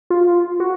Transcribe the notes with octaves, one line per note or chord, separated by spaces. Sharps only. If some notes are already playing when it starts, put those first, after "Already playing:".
F4
F4
F#4